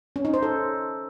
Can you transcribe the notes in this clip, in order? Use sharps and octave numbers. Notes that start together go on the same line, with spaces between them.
C#4
D#4
C5
A4